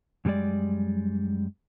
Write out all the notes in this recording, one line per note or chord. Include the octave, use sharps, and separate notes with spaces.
F#2 C#3 G3 G#3 D5